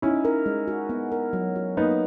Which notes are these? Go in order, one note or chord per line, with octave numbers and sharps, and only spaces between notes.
C#4 D#4 E4
A#4
G#3
F#4
B3
A#4
F#3
F#4
A#3 B3 D#4